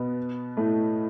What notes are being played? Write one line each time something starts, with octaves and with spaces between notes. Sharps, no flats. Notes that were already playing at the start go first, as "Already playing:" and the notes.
Already playing: B2 B3
A2 A3